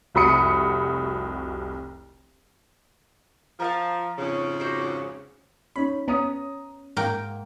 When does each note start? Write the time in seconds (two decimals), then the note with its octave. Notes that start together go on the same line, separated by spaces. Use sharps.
0.15 F1 C2 F#4 B5 D#6 C#7
3.60 F3 A#4 F5 A5
4.17 F2 G#2 C#3
4.60 F#4 C5 D5
5.76 C#4 D#4 B5
6.08 B3 C#4 A#5 D#6
6.97 G#2 A#3 D#4 G5